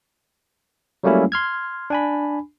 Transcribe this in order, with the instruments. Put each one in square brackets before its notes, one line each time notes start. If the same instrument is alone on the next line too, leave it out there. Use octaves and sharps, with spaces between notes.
[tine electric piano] F#3 G3 A3 A#3 C#4 E4
C6 F6 G#6
D4 G#5 B5